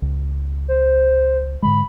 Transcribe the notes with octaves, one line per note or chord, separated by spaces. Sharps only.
C#2
C5
G#2 D3 G#3 B5